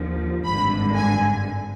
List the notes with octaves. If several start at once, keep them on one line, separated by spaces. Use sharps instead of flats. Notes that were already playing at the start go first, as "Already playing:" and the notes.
Already playing: D#2 D3 F3
G#1 G2 D3 B5
G#5